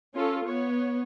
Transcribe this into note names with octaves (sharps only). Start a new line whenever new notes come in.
C#4 F4 A4
B3 C#5